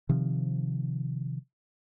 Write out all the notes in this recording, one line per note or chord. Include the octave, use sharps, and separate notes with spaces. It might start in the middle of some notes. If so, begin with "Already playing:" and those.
C3 D#3 F3